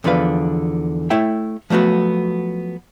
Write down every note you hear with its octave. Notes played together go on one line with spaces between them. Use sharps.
E2 D3 F3 B4 F5
A3 E4 C#5 E5 G5
F3 F#3 A3 B3 F#4